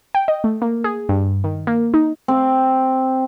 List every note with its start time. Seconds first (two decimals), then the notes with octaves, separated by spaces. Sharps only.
0.15 G5
0.28 D#5
0.44 A3
0.62 A#3
0.84 G#4
1.09 G2
1.44 D#3
1.67 A#3
1.94 D#4
2.28 C4